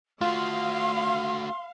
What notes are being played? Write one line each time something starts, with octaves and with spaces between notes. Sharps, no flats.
A3 F4 F#4 F5 C6